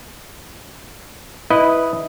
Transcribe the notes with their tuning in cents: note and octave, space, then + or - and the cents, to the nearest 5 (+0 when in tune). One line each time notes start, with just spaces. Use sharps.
E4 -10 B4 +0 D#5 +0